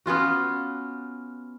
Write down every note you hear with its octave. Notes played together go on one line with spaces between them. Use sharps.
B3 C#4 F4 F#4